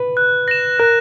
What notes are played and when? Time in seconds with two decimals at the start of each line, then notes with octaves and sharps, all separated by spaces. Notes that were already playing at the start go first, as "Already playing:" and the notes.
Already playing: B4
0.17 F#6
0.48 A#6 E7
0.80 A#4 F#6